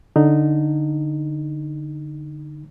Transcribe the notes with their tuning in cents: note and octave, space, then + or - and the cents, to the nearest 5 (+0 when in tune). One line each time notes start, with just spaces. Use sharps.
D3 +0 D#4 -10